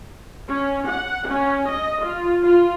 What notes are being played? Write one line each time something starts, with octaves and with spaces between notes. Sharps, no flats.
C#4
F#5
C#4
D#5
F4
F4